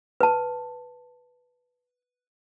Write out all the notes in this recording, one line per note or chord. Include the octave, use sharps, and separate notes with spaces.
B4 A5